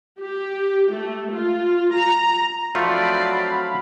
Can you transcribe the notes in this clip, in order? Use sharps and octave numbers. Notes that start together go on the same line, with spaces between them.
G4
A3
F4
A#5
F3 F#3 A3 C4 F4 D5 F5 B5